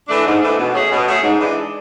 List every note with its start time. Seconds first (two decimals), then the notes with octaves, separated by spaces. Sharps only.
0.08 E3 A3 D4
0.25 G#2
0.41 E3 A3 D4
0.58 B2
0.74 A3 C#4 G#4
0.91 B2
1.07 A3 C#4 G#4
1.23 G#2
1.40 E3 G#3 D4